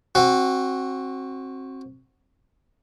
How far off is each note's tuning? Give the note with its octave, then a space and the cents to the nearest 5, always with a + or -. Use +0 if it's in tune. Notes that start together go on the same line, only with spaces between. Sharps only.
C4 +25 F#4 +0